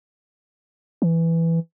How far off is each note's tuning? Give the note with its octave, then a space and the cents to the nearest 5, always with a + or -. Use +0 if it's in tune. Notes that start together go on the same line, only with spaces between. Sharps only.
E3 +5